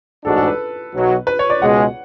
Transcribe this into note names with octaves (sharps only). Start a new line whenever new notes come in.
A1 G#2 G#3 D4 F#4 A4
A4
B4
B1 B2 F#3
B4
C#5
D5
C#2 B2 G#3 F#5